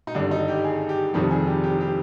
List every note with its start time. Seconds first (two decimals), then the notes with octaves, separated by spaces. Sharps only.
0.07 D#4
0.15 G#1 G2 D3 G3 D4
0.31 D#4
0.48 G4
0.64 G#4
0.89 G4
1.14 F1 F2 C3 D#3 G3 G4
1.31 G#4
1.47 G4
1.64 G4
1.81 G4